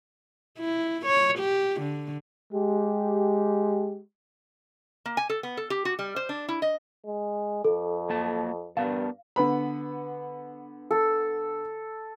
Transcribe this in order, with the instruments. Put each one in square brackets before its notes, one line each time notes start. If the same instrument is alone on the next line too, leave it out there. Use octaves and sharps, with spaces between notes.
[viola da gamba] E4
C#5
G4
D3
[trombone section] G#3 G4
[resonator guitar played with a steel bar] A#3
G#5
A4
B3
A4
G4
F#4
G3
C5
D4
E4
D#5
[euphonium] G#3
[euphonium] F2 [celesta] A4
[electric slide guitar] F#3 A#3 A5
[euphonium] G2 [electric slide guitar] B3 A#4 A5 [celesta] F5
[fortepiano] D3 B3 B5
[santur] A4